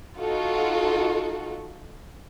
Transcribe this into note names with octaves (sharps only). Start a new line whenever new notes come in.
D#4 F4 F#4 A4